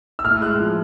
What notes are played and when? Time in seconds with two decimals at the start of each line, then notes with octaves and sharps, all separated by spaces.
0.19 E6
0.24 A2 F6
0.41 G#3 F#6
0.59 F3